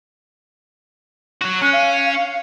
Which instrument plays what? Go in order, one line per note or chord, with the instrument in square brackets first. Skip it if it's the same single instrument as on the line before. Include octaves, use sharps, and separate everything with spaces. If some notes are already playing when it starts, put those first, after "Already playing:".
[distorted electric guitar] F#3 F#4
[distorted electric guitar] C#4 [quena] F#6
[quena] F5